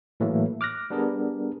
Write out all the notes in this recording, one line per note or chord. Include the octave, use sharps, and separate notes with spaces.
A2 E3 F#3 A3 A#3
D6 F6 F#6 A#6
G3 B3 D4 G#4 A#4